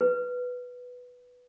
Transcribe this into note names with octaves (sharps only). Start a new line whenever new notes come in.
B4